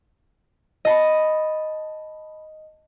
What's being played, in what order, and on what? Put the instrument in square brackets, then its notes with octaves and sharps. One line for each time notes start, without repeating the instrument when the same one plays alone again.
[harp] D#5 A5 B5